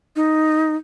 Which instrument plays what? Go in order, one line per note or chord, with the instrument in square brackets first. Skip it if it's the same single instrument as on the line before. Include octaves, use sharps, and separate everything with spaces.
[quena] D#4